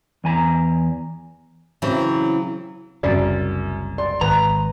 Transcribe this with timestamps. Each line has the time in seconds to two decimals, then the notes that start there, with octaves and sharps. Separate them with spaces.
0.24 E2 G#5 A#5
1.82 C#3 E3 F#3 C4
3.03 F#1 C2 F#2 C#3 D5
3.98 D5 C6
4.21 G#1 B4 A#5